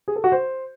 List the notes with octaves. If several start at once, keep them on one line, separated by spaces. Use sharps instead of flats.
G#4
A4
F#4
C5